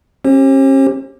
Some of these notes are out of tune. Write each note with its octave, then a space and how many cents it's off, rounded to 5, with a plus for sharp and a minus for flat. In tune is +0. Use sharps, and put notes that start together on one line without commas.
C#4 -40 G4 +0 C5 +45